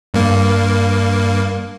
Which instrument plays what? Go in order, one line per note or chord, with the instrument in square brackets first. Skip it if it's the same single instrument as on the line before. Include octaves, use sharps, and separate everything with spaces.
[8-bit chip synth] G2 A#3